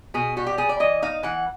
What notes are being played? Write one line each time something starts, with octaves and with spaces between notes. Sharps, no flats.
B2 G#4
G3 F#4
G4
G3 G#4
D5
E3 D#5
D#4 F5
E3 F#5